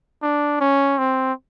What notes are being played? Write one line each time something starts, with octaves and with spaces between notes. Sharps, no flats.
D4
C#4
C4